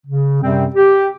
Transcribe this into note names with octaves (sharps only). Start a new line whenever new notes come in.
C#3
F#2 C3 G3 C4
G4